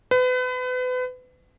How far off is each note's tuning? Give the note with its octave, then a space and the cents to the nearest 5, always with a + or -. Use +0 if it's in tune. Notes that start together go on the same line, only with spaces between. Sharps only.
B4 +35